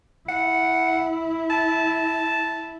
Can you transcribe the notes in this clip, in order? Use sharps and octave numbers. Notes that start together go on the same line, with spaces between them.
E4 F#5
A5